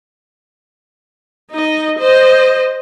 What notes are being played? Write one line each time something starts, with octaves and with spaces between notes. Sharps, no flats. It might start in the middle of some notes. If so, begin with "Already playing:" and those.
D#4 D#5
C5 D#5